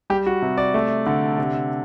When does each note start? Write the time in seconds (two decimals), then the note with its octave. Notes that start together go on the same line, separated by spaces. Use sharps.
0.10 G3 G4
0.26 F#4
0.42 C3
0.58 D5
0.74 A3
1.06 D3
1.38 C3